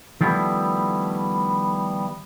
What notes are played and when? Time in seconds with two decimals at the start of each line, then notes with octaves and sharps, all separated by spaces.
0.21 D#3 F3 G3 A3 B3 E4